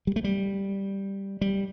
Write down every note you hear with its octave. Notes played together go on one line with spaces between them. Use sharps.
G3
A3
G3
G3